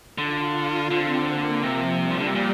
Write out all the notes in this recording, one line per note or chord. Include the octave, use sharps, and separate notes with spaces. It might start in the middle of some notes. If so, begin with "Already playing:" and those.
D3 F4
F4
D3 C4
A#3
C3 F3
G3
F3
D3
C3
A#2